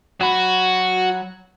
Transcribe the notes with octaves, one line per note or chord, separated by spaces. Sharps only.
F#3 F#4 B5